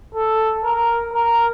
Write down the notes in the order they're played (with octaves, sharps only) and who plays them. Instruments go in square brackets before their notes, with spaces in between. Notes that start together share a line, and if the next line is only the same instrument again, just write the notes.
[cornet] A4
A#4
A#4